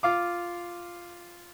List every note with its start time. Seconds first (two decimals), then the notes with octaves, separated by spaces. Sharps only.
0.03 F4 F5 D6